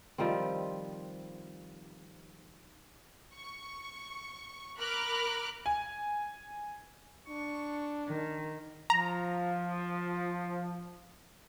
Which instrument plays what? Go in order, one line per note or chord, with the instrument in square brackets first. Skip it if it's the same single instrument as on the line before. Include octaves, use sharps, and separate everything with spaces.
[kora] D#3 F3 G3 C4
[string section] C#6
A#4 B5 D6 F6 F#6
[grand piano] G#5
[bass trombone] D4 [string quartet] C#6
[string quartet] D#3
[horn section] F3 [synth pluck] A#5